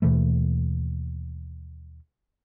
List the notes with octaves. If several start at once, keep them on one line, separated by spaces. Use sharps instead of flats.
D#2 B2 E3 A3